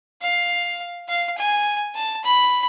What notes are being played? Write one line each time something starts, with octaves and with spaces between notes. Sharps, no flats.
F5
F5
G#5
A5
B5